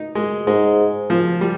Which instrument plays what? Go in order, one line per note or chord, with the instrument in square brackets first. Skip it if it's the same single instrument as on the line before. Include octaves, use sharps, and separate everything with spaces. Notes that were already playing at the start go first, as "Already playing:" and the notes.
Already playing: [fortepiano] D#4
G#3
[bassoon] G#2 [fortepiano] G#3
[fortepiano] F3
G3